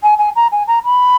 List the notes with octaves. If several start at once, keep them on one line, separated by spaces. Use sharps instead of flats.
G#5
G#5
A#5
G#5
A#5
B5